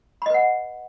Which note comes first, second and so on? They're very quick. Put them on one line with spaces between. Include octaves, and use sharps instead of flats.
B5 D#5 B4 F#5